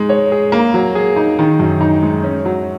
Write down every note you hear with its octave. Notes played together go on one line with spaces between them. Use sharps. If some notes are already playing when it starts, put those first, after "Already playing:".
Already playing: G#3 D#4
C#5
G#4
A#3
F#3
G#4
D#4
D#3
F#2
D#4
G#3
C#4
F#3